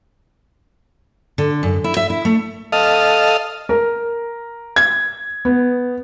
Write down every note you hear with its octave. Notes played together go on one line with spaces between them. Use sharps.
D3
F#2
E4
E5
E4
A3
A4 D#5 F5
A#4
G#6
B3